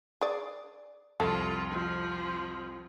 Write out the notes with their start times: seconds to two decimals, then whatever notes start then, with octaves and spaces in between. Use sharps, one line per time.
0.21 G#4 D5
1.20 C2 F2 F4 A4
1.71 F3